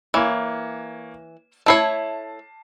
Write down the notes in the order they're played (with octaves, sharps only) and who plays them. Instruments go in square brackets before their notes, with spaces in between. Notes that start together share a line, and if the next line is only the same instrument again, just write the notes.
[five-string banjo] E3 [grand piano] A#3 C#5
[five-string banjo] A3 E4 C#5 [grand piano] A5 C7